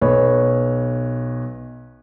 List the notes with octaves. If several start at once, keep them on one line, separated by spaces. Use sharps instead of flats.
B1 B4 C#5